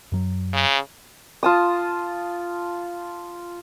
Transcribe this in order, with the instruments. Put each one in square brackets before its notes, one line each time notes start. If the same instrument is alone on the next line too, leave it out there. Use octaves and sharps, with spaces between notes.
[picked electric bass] F#2 F#3
[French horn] C#3
[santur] F4 A5 D#6